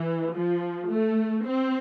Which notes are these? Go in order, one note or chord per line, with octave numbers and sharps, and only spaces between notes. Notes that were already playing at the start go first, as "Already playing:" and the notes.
Already playing: E3
F3
A3
C4